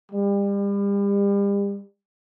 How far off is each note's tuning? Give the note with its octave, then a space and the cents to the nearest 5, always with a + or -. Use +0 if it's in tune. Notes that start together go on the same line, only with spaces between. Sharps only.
G3 +35